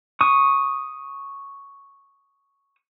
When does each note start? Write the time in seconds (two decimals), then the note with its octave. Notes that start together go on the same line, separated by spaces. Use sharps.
0.21 C#6 D#6